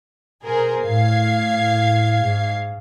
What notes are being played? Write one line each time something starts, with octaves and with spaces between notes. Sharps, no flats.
B2 G#4 A#4 C5
A2 F5 G#6 C7
G#2